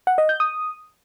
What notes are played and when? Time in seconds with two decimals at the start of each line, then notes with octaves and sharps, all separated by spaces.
0.07 F#5
0.18 D#5
0.29 G6
0.40 D#6